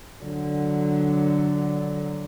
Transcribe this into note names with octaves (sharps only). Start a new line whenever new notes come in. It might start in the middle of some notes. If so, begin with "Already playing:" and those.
D3 F#3